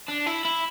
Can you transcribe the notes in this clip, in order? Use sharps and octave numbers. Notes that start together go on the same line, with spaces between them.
D4
E4
E4